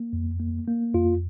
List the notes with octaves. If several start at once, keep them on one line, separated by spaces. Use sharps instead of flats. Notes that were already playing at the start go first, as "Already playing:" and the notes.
Already playing: A#3
F2
A#3
A#3
F2 F4